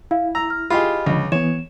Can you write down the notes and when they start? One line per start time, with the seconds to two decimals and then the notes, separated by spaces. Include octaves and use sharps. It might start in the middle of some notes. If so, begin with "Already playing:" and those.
0.11 E4 F5
0.35 A#5 E6
0.50 F6
0.70 F4 G4 G#4 D#5 B5
1.06 C#2 D3 F3
1.32 E3 B3 C#5 E7